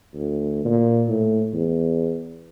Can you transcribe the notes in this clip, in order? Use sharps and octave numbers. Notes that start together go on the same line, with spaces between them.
D2
A#2
A2
E2